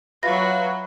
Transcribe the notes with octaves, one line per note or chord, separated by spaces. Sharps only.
F#3 F4 F#4 B4 E5 B5 A#6